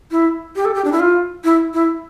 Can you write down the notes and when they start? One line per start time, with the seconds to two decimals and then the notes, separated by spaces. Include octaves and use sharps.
0.11 E4
0.56 G4
0.65 A4
0.75 G4
0.85 D4
0.92 E4
1.00 F4
1.44 E4
1.74 E4